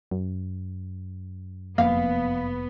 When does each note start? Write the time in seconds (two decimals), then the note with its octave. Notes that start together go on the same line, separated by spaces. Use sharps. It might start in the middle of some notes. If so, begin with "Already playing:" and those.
0.11 F#2
1.78 F1 F2 A#3 B3 F5